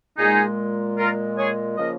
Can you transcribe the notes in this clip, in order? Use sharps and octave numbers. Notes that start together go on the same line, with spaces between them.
A#2 G#3 D#4 G#4
F4 A#4
G#4 C#5
C#3 F3 A#3 A#4 D#5